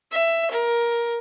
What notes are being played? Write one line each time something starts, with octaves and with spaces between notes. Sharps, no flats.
E5
A#4